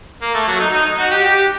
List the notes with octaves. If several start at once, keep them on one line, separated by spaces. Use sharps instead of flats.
A#3
A3
F#3
D#4
D#4
D#4
F#4
G4
G4